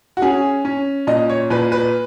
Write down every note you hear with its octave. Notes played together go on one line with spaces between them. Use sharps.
F#4
C#4 G#4
C#4
A#2 D#5
C#5
A#2 B4
B4